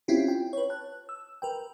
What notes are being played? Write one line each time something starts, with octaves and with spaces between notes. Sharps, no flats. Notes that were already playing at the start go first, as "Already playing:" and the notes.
C4 C#4 E4 F4 G4
G5
B4 C#5
A5 F#6
E6
A#4 B4 G5